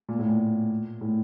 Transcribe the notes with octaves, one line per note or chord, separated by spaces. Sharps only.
A#2
A2
A#2
A2